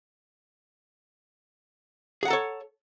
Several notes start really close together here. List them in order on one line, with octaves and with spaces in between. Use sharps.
G#4 F#5 A#5 A4 C#5